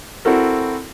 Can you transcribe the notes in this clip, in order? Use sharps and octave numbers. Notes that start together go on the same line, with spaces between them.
C4 E4 F#4 A4 A#4